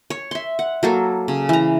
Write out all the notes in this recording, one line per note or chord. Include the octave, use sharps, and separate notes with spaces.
C#5
E5 C6
F#5
F#3 A#3 A4
C#3
E3 A#5